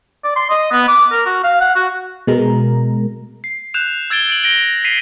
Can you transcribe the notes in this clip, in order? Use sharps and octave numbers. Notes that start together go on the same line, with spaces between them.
D5
C6
D#5
B3
D6
A#4
F#4
F5
F#5
F#4
B2 G#3 A#4 A#5
C7
F#6 G6 E7 F7
E6 G#6 A6 D7 G7
D7 F#7
A#6 D7 G7
B6 C7 D#7 F7